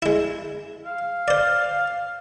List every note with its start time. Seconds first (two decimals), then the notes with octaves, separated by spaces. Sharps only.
0.02 G#3 E4
0.85 F5
1.28 C5 D5